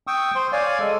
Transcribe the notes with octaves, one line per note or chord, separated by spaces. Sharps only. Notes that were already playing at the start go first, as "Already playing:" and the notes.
G5 C#6 D#6 E6
C5 C6
C#5 D5 F5 G#5
G#3 A4